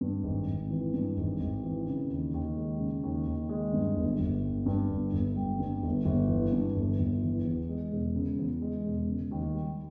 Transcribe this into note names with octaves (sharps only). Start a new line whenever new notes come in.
G2
G#1
G#1
E3
G2
G#1
G#1
E3
C#3
D#2
D#2
G#3
C#3
D#2
D#2
G#3
G2
G1
G1
G3
G2
G1
G1
G3
G2
G1
G1
E3
G2
G1
G1
E3
E2
G#3
E1
C#3
E2
G#3
E1
C#3
D#2
G3